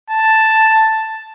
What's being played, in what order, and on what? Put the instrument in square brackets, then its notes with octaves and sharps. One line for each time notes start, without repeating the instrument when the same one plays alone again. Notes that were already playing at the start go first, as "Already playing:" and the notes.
[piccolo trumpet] A5